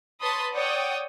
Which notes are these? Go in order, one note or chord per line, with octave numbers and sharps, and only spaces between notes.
B4 C#5 A5 B5 C6 D#6
C#5 D5 F#5 G5 D#6